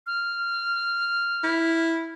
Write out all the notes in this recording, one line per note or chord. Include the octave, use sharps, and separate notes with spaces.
F6
E4